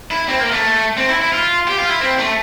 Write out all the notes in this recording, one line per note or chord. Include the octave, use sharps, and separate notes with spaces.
E4
C4
A#3
A3
C4
E4
E4
F4
G4
F4
E4
C4
A3